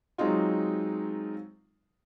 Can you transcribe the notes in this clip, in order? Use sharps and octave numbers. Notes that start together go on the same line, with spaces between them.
F#3 G#3 C4 D#4 F4